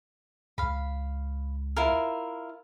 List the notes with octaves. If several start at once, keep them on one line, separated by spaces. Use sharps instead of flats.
C#2 F5 B5
E4 F4 A#4